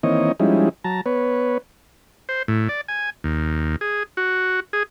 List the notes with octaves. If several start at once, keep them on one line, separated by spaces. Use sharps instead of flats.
D#3 E3 A#3 C4 C#5 D#5
F3 G3 G#3 C#4 D#4 E4
F#3 A5 A#5
B3 B4 C#5
C5
A2
D5
G#5
D#2
G#4
F#4
G#4